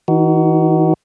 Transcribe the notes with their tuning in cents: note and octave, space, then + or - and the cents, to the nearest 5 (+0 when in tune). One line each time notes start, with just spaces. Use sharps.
E3 -35 D#4 +0 F#4 +25